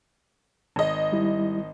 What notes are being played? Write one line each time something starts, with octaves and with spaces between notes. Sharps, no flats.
G#1 D#5
G3 E4